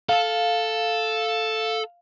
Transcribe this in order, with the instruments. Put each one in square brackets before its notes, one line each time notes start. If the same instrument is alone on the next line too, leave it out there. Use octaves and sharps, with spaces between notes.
[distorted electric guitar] A4 [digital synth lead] F5